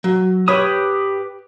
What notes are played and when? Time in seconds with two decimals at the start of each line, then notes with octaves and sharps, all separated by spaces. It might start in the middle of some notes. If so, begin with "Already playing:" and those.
0.04 F#3
0.48 G4 B4 C#5 B5 D#6